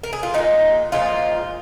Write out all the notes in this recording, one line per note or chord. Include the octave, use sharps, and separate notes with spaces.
A#4
G#4
F4
A#2 F3 G#3 D#4
A#2 F3 G#3 F4